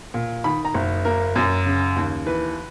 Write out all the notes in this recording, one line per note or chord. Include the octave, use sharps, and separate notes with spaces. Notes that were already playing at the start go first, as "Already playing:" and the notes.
A#2
D#3 B5
A#5
F#1
A#3 A#4
F#2
C#3
D#2
E3 B4